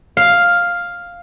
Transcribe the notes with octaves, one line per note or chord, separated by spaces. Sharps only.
F5